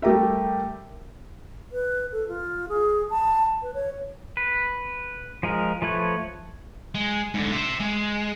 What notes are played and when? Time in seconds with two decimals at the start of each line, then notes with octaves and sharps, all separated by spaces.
0.02 G3 A3 G4 A#4 E5
1.72 B4
2.12 A4
2.28 F4
2.69 G#4
3.10 A5
3.62 B4
3.74 C#5
4.37 B4
5.43 F3 G#3 A#4
5.82 F3 A3 B4 C#5
6.95 G#3
7.34 G#2 D3
7.52 C5 E5
7.80 G#3